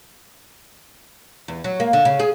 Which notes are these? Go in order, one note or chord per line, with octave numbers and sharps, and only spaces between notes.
E2
F#3
A#3
D3
C#3
G#4